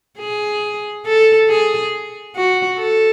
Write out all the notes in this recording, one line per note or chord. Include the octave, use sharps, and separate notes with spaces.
G#4
A4
G#4
F#4
A4